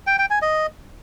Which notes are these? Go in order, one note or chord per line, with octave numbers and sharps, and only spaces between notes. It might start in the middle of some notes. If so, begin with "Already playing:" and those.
G5
G5
G#5
D#5